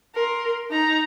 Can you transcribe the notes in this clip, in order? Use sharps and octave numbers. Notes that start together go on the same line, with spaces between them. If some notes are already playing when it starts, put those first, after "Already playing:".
A#4 C6
D#4 A#5